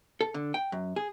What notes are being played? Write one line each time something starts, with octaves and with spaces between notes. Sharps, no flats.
A4
D3
G5
F#2
G#4